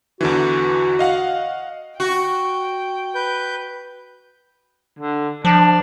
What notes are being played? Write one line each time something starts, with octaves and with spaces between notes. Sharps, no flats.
E2 D3 E3 F#4
D#5 F5 F#5
F#4 G5
B4 G6
D3
F3 D4